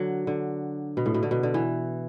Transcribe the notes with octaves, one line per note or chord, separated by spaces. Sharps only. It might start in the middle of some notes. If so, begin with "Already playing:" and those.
Already playing: D3 F#3
D3
B2
A2
B2
D3
B2
D3
E3